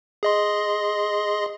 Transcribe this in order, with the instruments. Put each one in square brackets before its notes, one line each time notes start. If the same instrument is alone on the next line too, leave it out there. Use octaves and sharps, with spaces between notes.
[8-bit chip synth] G#4 D#5 C6